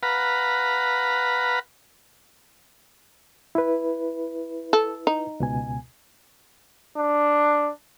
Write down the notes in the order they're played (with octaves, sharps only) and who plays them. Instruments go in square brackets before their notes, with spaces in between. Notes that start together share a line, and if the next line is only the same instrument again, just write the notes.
[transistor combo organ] B4 F5 F#5 A#5 B5
[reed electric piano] E4 B4
[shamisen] A4
D#4
[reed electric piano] C#2 B2 G#5
[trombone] D4